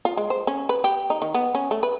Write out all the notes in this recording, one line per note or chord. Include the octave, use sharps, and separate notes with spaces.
F4
G#3
C5
C#4
B4
G4
D#4
D#3
B3
C#4
A3
B4